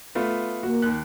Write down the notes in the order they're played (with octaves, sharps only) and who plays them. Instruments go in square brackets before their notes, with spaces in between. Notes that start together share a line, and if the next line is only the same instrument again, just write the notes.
[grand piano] A3 B3 F4
[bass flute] A#3 [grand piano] F#4
[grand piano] D#2 F#6